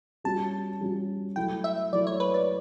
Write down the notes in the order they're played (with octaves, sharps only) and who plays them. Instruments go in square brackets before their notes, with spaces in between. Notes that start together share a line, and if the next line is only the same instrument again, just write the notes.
[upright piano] G3 C#4 F#4 [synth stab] A5
[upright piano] G3 C#4 F#4
[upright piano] F#3 A3 E4 [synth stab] G5
[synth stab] E5
[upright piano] F#3 A3 E4 [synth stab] D5
[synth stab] C#5
B4
D5